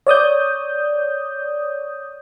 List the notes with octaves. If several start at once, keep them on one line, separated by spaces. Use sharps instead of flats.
C#5 D5 D#6 G6